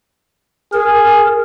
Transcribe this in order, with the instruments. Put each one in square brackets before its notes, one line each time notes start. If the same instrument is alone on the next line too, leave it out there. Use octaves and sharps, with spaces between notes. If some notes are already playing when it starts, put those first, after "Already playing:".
[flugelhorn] G#4 [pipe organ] A#4